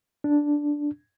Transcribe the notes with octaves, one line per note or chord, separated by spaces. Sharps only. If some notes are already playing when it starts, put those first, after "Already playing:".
D4